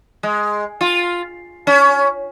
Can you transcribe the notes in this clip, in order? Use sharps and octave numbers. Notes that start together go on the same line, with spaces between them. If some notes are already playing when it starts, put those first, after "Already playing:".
G#3
F4
C#4